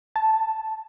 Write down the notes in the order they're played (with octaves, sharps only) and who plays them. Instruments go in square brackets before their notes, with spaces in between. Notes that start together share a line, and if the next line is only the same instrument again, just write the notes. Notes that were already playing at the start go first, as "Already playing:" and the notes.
[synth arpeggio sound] A5